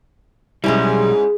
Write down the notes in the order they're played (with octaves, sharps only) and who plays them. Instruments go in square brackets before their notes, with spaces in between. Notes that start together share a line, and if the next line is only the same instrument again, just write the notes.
[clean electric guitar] B1 G3 [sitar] G#2 [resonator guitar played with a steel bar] G#3 C#4 E4